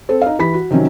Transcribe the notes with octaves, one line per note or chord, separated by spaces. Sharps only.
C4 A4 C5
D#4 F5
E3 G4 B5 B6
F#4
C3 D#3 F#3 C#4